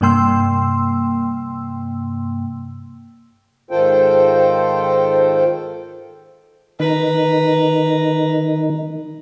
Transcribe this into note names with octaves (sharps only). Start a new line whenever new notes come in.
G2 C3 A#3 G5 C6 E6
G#2 D#3 F4 A4 C5 G5
D#3 B4 A#5